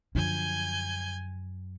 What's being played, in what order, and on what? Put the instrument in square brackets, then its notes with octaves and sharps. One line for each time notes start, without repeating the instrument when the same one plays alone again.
[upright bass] F#2 [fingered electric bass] D3 F3 [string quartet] G#5 G6 G#6